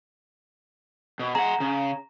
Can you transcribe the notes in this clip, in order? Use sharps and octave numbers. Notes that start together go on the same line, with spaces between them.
B2
G#4 F#5 A#5
C#3